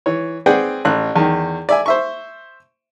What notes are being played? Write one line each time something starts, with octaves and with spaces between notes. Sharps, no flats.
E3 C#5
C4 G#4 B4 D5 F#5 G5
A1 F#6
E2 D#3
D5 E5 G#5
C5 E5 C#6